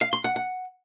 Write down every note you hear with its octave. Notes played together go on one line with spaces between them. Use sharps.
F5
C6
F#5
F#5